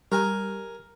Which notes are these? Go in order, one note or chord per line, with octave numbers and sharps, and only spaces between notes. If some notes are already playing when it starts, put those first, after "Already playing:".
G3 A#4 G#5